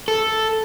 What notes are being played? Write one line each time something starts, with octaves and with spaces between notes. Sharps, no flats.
A4